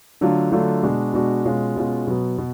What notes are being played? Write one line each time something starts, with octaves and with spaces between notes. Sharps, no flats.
D3 F#3 A3 D4 F4
D3 F#3 A3 D4 F4
B2 G#3 D4 F#4
B2 G#3 D4 F#4
B2 G#3 C#4 F4
B2 G#3 C#4 F4
B2 F#3 B3
B2